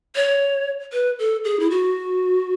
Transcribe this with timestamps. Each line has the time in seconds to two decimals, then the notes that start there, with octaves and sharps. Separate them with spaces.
0.16 C#5
0.93 B4
1.19 A4
1.44 G#4
1.60 E4
1.70 F#4